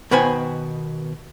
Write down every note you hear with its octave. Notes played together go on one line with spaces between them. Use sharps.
B2 D#3 B3 B4 C5 G#5